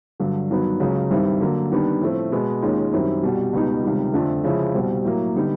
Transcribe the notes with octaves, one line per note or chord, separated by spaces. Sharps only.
G2 D3 F#3
G2 D#3 F#3 B3
C#2 C#3 F#3
G2 D#3 G3 C4 E4
D3 F#3 A#3
D#3 G3 B3 D4
A2 F3 A3 C4
B2 G#3 B3
D#2 D#3 G#3 C#4 F4
F#2 D#3 G3 C4 E4
C2 B2 G3
C#2 B2 G3 B3 D#4
C#2 C3 D#3 G3
F2 D3 F3 A3 D4
C#3 F3 G#3 C#4 E4
C2 B2 G3 C4
A2 F#3 A#3
D3 G3 B3 D#4